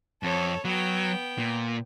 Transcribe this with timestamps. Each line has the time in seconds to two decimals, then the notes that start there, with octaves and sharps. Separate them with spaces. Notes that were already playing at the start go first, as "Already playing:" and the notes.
0.23 F2 A4 C#5
0.65 F#3 B3 G5
1.39 A#2